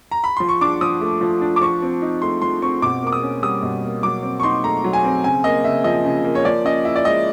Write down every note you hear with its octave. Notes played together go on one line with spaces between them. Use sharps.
A#5
B5
F3 C6
C#6
D4 D6
F3 D#6
A3
F3
D4
D6
F3 C#6
C4
D#4
A3 C6
F3 C6
C4 C#6
B2 D6
A#3 D6
D#6
C#4
G3 D#6
B2
A#3
F#3 D6
C4
C#6
D#4 C6
A3 A#5
F#3
G#5
C4
C#3 G#5
A#3 D#5
C#3 E5
F3 D#5
C#3
A#3
C#5
F3 D5
C#4 D#5
E4 E5
D5
G#3 D#5